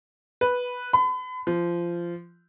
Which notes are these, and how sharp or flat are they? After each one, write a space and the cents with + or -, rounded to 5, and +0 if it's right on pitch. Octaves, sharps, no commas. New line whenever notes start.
B4 -5
B5 +40
F3 -20